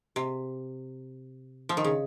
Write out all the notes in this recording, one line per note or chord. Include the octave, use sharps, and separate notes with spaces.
C3
F3
D#3
C#3